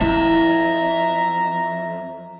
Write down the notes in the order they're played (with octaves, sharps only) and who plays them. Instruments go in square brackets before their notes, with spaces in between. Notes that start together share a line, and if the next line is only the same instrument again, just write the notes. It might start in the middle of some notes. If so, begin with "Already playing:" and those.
[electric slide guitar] F2 [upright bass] E4 [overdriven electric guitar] E5 [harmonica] A#5